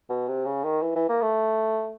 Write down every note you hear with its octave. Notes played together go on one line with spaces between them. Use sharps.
B2
C3
C#3
D#3
E3
E3
A#3
A3